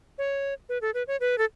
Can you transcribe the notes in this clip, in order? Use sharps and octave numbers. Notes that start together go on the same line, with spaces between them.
C#5
B4
A4
B4
C#5
B4
A4